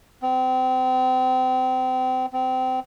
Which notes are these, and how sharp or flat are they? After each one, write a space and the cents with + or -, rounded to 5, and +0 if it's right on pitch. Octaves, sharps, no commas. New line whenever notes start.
C4 -30
C4 -25